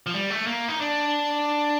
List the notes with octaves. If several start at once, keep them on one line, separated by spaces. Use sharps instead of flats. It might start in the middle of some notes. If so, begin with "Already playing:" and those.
F3
G3
A3
A#3
D#4
D4